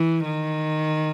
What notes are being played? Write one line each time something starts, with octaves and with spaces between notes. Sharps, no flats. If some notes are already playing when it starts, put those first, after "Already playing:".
Already playing: E3
D#3